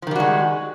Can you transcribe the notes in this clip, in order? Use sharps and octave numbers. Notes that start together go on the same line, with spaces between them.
D#3 F3 G3 G#3 F#4